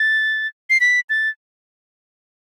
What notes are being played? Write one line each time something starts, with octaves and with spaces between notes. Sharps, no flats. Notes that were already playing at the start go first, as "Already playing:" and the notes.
Already playing: A6
C7
B6
A6